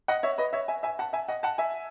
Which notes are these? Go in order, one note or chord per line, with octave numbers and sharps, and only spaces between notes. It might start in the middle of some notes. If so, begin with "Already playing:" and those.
D#5 F#5
C#5 E5
B4 D#5
C#5 E5
E5 G#5
E5 G#5
F#5 A5
E5 G#5
D#5 F#5
F#5 A5
E5 G#5